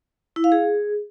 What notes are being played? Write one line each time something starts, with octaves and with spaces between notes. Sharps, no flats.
E4
F5
G#4